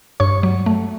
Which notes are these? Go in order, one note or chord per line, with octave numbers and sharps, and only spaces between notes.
G2 C#5 C#6
F#3
A3